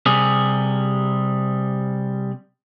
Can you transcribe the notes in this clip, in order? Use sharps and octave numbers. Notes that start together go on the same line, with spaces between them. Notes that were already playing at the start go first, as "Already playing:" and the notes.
C3 G3 G#4